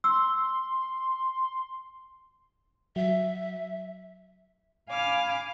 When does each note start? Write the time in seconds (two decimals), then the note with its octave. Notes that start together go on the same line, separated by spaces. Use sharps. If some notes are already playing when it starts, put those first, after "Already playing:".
0.04 C6 E6
2.96 F#3 E5
4.89 F5 G#5 B5 D6 F6